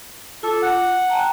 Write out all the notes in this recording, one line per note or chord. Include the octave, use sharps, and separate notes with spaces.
F4 A4 D6
F#5
G5 A5 A#5